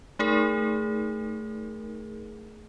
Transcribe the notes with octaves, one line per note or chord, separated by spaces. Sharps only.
A3 D#4 G#4 A#4